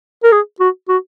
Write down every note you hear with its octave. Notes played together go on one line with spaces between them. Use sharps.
A#4
G#4
F#4
F#4